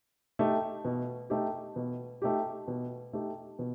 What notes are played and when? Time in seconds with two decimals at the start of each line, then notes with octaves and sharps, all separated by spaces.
0.39 A3 D#4 G4
0.85 B2
1.30 A3 D#4 G4
1.76 B2
2.22 A3 D#4 G4
2.68 B2
3.13 A3 D#4 G4
3.59 B2